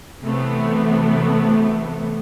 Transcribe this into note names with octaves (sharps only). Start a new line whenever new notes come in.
C3 E3 F#3 A3 B3